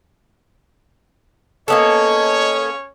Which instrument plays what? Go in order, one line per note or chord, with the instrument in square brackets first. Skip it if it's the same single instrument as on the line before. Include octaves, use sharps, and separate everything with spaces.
[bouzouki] A#3 B3 A4 [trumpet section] C#4 C#5 [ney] D#5